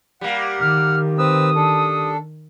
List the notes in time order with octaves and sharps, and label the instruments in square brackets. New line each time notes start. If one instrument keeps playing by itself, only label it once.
[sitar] G3 A#3 [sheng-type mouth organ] F#5
[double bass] D#3 [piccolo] F6
[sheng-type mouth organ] C4 B4 E6 [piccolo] D#6
[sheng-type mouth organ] D4 A4